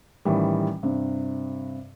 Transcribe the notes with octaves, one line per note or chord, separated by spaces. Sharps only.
A1 D#3 E3 G3
G2 C3